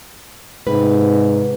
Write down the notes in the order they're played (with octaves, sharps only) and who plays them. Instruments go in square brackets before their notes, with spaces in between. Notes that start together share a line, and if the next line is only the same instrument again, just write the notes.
[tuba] G#2 [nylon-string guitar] C3 B4